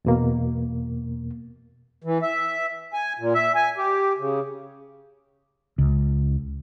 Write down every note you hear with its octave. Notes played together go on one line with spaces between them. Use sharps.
E2 B2 A#3
E3
E5
G#5
A#2
E5
G#5
G4
C#3
C#2